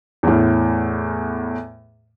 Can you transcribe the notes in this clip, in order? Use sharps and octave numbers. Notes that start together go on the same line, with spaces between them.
E2 A2